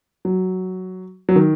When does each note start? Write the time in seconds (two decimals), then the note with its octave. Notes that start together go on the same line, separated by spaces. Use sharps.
0.25 F#3
1.29 F#3
1.36 D#3